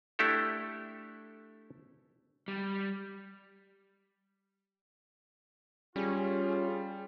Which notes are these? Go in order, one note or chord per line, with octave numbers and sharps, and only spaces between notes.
A3 D4 E4 G4 A4
G3
G3 C#4 F4 G#4